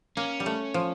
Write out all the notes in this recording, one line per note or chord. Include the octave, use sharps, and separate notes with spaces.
A#3 C#4
G3
A3
F3